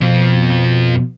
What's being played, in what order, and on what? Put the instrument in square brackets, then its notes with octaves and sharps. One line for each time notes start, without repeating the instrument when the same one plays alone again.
[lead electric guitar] F2 F3 [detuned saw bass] B2